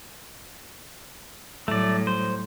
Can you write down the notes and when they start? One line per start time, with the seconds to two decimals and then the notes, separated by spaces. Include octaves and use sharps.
1.68 A2 F#3 G3 A3 D5
2.07 C5